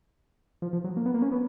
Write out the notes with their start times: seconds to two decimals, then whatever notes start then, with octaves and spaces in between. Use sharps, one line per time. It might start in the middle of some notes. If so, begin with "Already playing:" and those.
0.62 F3
0.73 F3
0.84 F#3
0.97 A#3
1.06 B3
1.14 A#3
1.22 C#4
1.32 B3